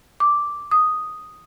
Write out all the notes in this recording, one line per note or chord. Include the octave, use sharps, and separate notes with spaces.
D6
D#6